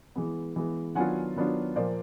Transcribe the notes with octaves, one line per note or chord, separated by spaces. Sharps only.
E3 G#3 B3
E3 G#3 B3
D#3 F#3 B3 D4 F4 F#5 G#5
D#3 F#3 B3 D4 F4
A#2 F3 A#3 C5 D5